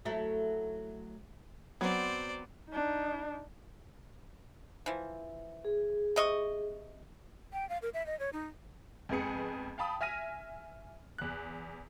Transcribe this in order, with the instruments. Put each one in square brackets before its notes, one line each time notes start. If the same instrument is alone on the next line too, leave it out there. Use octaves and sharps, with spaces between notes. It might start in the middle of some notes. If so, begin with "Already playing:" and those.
[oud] F#3 A3 E4
[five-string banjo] F#3 [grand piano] B3 C4 [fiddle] C5 D5
[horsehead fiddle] D4 D#4
[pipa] E3 F3
[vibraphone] G#4
[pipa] C3 D#5 C#6
[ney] G5
F5
A#4
E5
D#5
C#5
D#4
[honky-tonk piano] F2 G#2 B3 G#4 C#7
F5 G5 A5 B5 D#6
E5 G#5 F6 A#6 D#7
E2 F#6